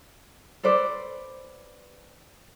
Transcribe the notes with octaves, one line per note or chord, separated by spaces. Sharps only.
A4 B4 C5 D5